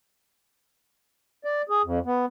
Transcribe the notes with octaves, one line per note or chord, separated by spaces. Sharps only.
D5
G#4
F2
B3